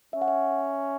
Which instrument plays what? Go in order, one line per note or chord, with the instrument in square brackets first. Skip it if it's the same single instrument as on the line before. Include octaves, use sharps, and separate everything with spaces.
[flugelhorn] C#4 [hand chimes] E5
[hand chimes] F#5
E5